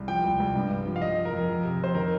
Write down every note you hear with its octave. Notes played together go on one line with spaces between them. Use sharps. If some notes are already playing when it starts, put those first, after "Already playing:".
Already playing: C2
F3 G5
C2
C2
G2
G2
F3
F5
F3 D#5
F3
A#4
F2
F2
C3
F2 C5
D#3 A#4